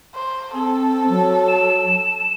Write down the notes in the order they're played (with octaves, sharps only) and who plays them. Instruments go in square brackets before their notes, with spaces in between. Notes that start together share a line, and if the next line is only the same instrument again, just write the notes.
[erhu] C5
[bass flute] C4 [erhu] A4
[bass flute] F#3
[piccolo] E7